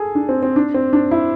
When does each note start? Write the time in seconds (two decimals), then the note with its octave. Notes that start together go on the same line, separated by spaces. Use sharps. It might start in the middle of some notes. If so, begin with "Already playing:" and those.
Already playing: G#4 A4
0.15 D4
0.29 C4
0.43 C4
0.56 D4
0.74 C4
0.93 D4
1.11 E4